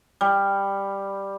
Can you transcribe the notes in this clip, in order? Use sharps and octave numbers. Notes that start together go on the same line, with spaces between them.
G3